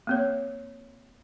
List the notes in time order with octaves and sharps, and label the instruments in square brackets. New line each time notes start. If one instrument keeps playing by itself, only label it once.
[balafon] A#3 C4 C#5